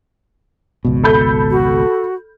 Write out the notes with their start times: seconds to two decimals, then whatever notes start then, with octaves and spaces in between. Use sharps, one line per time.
0.85 G#1 C#2 B2
1.04 A4 B5 G6
1.51 F#4